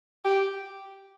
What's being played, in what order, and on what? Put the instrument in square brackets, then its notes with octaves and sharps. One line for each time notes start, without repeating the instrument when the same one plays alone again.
[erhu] G4